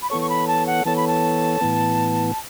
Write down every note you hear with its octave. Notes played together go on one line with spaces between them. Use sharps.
B5
E3 B3 A4 C#5 C#6
C#6
B5
A5
F#5
E3 B3 A4 C#5 A5
B5
A5
A2 E3 B3